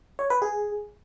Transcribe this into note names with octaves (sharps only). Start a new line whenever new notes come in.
C#5
B4
G#4